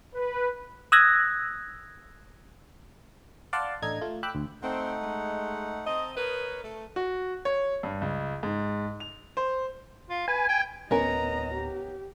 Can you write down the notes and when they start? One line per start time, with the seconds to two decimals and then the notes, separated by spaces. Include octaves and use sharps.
0.15 B4
0.92 D#6 E6 F#6 G#6 A#6
3.53 D5 F5 F#5 A5 C6
3.82 A1 D4 A4 D#5 A#5 G#6
4.01 A3 F4
4.23 G5 B5 D6 E6 F#6
4.35 D2
4.63 A3 C4 D#4 F#5
5.02 G#3
5.86 C4 D#5 A5 A#5 D#6
6.17 D#4 A#4 B4 C#5
6.63 A3
6.96 F#4
7.45 C#5
7.83 G2
8.01 C#2
8.43 G#2
9.00 F7
9.37 C5
10.10 F4
10.28 B4 G#5
10.48 G5
10.91 D1 B3 C#4 A#4 D#5 A#5
11.55 G4